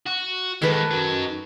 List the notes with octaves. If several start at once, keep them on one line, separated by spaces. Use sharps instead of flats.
F#4
D#3 E3 G#3 A4 B4
F#2 F#3